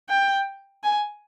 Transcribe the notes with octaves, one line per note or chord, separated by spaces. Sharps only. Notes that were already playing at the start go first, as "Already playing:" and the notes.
G5
G#5